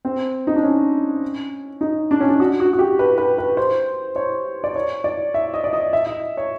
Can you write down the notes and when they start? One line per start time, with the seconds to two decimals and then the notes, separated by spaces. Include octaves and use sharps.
0.05 C4
0.47 D#4
0.56 D4
0.63 C#4
1.81 D#4
2.11 D4
2.20 C#4
2.29 D4
2.40 F#4
2.60 F#4
2.73 F#4
2.79 G4
2.99 B4
3.18 B4
3.38 B4
3.57 C5
4.16 C#5
4.64 D5
4.76 C#5
5.04 D5
5.34 E5
5.54 D#5
5.64 D5
5.73 D#5
5.93 E5
6.07 D#5
6.37 C#5